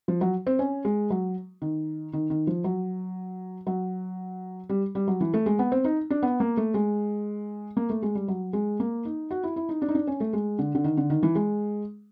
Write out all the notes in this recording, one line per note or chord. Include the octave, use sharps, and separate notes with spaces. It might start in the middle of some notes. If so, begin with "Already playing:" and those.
F3
F#3
C4
C#4
G#3
F#3
D#3
D#3
D#3
F3
F#3
F#3
G3
G3
F#3
E3
A3
G#3
B3
C4
D#4
D4
B3
A#3
A3
G#3
A#3
A3
G#3
G3
F#3
G#3
A#3
D#4
F#4
E4
E4
D#4
D4
D#4
D4
C#4
A3
G#3
D3
D3
D#3
D3
D#3
E3
G#3